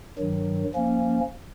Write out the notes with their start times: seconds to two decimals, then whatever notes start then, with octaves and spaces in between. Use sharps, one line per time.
0.18 G2 D#3 F#3
0.75 F3 A#3 C#4